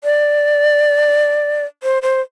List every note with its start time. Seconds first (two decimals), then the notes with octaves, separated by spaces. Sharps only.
0.04 D5
1.83 C5
2.03 C5